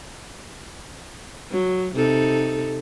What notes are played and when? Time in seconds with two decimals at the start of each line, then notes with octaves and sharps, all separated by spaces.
1.51 F#3
1.95 C3 D#4 A4